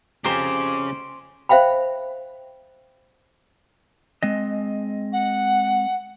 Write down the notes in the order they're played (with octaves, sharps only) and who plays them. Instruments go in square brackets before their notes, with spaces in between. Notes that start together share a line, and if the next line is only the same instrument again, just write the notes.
[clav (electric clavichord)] F2 G4 D#5 [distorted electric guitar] C#3 [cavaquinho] C5 G#5 A#5 [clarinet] D6
[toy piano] C5 E5 F5 G5 B5
[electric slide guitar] G#3 C4 D#5
[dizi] F#5